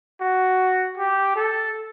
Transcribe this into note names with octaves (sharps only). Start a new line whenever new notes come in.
F#4
G4
A4